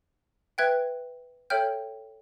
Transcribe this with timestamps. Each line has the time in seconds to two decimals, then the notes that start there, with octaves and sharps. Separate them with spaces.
0.58 B4 E5 G5 F#6 G#6
1.50 A4 C#5 E5 G5 F6 G6